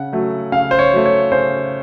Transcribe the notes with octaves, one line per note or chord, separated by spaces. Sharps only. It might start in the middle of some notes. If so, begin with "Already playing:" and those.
Already playing: C#3 F#5
F#3 A3
C#3 F5
C5
C#5
F#3 A3
C#5
C#3 C5